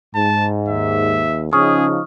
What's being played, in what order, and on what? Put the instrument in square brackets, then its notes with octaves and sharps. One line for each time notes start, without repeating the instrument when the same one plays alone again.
[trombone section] G#2 [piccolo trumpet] A5
[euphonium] D#2 [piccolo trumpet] E5
[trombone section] C#3 F3 D#4 [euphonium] C#4 [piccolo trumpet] G#4 [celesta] C#6 D#6 F6